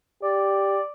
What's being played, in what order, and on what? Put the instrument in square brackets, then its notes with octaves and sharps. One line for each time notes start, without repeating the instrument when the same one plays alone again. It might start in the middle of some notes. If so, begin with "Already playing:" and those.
[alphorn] G4 [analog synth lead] D5